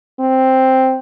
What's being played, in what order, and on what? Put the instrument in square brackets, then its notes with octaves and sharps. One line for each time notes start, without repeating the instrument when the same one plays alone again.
[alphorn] C4